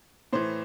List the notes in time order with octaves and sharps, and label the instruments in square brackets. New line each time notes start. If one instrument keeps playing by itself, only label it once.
[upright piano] A2 E3 C5